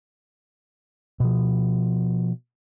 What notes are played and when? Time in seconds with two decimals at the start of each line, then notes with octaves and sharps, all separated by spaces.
1.20 B2 F3